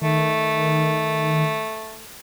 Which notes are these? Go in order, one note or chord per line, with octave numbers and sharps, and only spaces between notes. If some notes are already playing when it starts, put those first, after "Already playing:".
D#3 A3